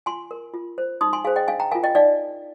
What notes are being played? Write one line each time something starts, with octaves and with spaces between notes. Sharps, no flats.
F4 G#5 C6
A#4
F4
C5
D#4 C6 D#6
G#5 C6
G#4 C5 F5 G#5
D#5 G5
D4 F5 G#5
G5 A#5
F4 A#4 F5 G#5
D#5 G5
D#4 D5 F5